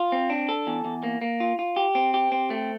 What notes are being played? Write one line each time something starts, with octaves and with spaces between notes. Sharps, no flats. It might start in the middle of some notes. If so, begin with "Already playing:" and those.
Already playing: F4
C4
D4
A4
E2
E2
A#3
A#3
F4
F4
G4
C4
G4
C4
A3